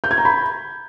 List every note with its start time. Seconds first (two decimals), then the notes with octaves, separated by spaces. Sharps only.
0.04 G6
0.11 G#6
0.18 A#5
0.25 B5